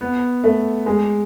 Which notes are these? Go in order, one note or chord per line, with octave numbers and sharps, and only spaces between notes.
B3
A3
G#3